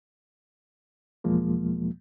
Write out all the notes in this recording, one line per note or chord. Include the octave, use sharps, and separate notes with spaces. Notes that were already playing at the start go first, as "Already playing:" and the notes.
E2 B2 F3 G#3 A#3